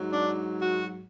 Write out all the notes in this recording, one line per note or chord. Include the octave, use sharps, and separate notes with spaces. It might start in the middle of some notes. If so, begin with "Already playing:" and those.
Already playing: G#2 F#3
D4
F#4